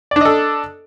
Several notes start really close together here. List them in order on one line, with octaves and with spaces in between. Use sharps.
D5 D4 D#5 A4